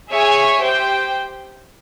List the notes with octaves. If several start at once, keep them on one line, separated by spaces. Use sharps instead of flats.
G#4 C#5 E5 G#5
G4 C5 G5